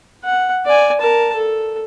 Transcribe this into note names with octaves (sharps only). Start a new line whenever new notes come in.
F#5
D5 G#5
A#4 A5
A4